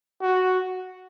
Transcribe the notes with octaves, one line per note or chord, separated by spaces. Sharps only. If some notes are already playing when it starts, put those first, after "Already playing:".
F#4